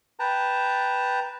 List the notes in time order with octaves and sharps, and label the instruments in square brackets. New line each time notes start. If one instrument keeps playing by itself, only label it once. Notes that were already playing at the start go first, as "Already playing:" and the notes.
[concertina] B4 G5 A5 A#5